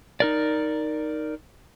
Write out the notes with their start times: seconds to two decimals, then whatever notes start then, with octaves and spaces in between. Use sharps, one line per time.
0.20 D#4 A#4 D5